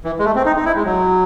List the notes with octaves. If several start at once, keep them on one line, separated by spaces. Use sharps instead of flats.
E3
G#3
A3
C4
D#4
D#4
E4
G#3
F#3